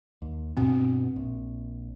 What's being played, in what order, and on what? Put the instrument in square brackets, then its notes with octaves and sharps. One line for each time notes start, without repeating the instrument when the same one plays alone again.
[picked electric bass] D#2
[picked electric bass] G2 B2 B3 [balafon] C4
[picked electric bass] A#1